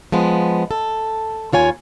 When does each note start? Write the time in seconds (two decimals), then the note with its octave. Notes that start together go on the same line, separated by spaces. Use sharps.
0.12 F3 G#3 B3
0.71 A4
1.52 D#2 F4 C#5 G#5